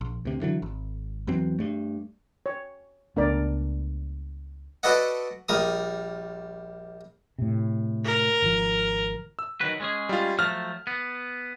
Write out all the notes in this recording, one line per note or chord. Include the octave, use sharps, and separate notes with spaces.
A#1
D2 C3
D3 E3 F#3
G#1
E2 E3 F#3 C4
G2 A3
C#5
C#2 A3 B3 D4 A#4 D5
F#4 A4 B4 D5 D#5 F#5
A#1 G3 A#4 D#6
A2 C3
A#4
G#1 F3
E6
D#3 F#3 B4
G#3 C#4 G#4
G3 F4
F3 F#3 A3 F6
B3